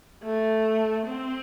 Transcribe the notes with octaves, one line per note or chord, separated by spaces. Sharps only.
A3
C4